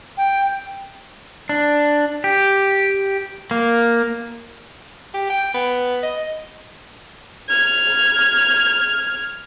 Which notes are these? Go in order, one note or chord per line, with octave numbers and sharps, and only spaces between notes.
G5
D4
G4
A#3
G4
G5
B3
D#5
F6 G#6